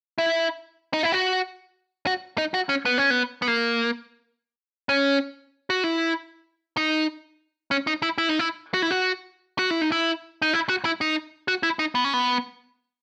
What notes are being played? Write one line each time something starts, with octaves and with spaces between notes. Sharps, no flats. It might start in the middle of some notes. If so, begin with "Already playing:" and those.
E4
D#4
E4
F#4
F#4
D#4
F#4
C#4
B3
C#4
B3
B3
A#3
C#4
F#4
E4
D#4
C#4
D#4
E4
E4
D#4
E4
F#4
E4
F#4
F#4
E4
D#4
E4
D#4
E4
F#4
E4
D#4
F#4
E4
D#4
B3
C#4
B3